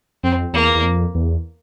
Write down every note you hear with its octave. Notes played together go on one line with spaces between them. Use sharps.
F2 C4
E2 A#3
E2
F2
E2